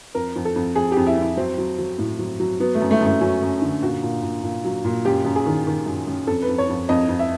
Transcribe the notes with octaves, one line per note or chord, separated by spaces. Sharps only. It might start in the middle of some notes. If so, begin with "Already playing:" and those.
F2 A#4
F2
A4
F2
F2 G#4
G4
F2
E4
F2 E4
F#3 C4
F#3
F#3
A2
F#3
F#3
F#3 B3
A3
F#2
A3
F#2 A3
F#3 C#4
F#2
D3
A#2 F#4
A#2
A#2
A#2
F#3
A#2
F#2 G4
F#2
G#4
D#3
D#3
F#2
F#2
F2 A4
B4
F2
C#5
F2
F2 D#5
F2
E5